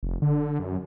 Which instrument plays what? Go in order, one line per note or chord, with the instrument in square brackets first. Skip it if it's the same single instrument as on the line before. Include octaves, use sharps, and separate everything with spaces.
[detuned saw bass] F1
D3
F#2